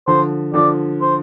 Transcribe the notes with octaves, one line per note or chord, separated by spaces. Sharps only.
D3 F3 C5
D3 F3 D5
C5